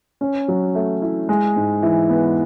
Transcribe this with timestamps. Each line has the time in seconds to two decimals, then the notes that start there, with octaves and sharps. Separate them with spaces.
0.21 C#4
0.48 F#3
0.75 A3
1.02 E4
1.29 G#3
1.56 G#2
1.82 E3
2.10 B3